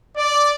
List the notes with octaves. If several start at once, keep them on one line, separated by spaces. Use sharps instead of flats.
D5